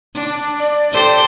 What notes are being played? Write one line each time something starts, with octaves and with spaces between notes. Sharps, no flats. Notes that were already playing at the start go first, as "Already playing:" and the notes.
D4
D5
G4 A4 C5